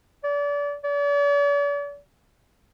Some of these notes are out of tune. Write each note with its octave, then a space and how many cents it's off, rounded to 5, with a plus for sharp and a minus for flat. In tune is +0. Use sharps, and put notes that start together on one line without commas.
D5 -30
D5 -45